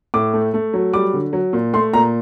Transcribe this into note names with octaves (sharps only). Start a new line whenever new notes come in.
A2 D6
A3
A3
F#3
G3 D6
D3
F#3
A#2
A3 C6
A#2 A#5